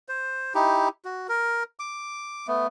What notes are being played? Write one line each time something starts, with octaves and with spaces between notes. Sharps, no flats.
C5
D#4 E4 G4
F#4
A#4
D6
A3 B3